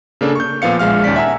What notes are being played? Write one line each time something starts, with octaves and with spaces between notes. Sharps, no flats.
C#3 A#3 D4 A4
C#6 G6
A#2 F3 B3 F5 C#7
A#1 G#3 F5 F6
D#2 C#4 D5 B6
E5 F#5 G#5 A#5 E6